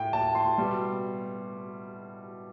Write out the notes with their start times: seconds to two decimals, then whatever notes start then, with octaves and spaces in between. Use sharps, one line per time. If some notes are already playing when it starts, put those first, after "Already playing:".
Already playing: A2 G5
0.13 A5
0.35 C6
0.58 B2 G3